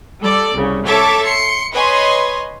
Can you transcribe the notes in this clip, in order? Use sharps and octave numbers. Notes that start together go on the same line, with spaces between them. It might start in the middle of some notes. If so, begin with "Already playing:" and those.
G3 A4 D5
C2 C#3
A4 C#5 E5 A5 D6
C6 C#7
B4 C#5 D#5 G#5 C6